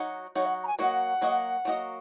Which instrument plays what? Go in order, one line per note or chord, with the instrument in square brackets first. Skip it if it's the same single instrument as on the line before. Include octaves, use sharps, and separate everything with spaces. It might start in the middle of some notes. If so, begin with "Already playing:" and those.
Already playing: [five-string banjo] F#3 D#4 F#4
[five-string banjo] F#3 D#4 F#4 [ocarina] C#5
[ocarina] F#5
A#5
G#5
[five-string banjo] F#3 A#3 F#4 D#5 [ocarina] F#5
[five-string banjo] F#3 A#3 F#4 D#5
F#3 A#3 F#4 D#5